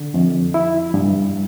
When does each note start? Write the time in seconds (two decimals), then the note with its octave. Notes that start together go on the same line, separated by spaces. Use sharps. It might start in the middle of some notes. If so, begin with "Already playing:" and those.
Already playing: D3
0.14 F2
0.54 E4
0.94 G2